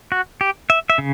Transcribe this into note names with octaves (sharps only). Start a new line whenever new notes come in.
F#4
G4
E5
E5
C#3